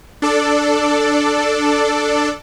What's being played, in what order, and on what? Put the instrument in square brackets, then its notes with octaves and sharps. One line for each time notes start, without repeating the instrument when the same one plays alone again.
[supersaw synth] D4 A4 D5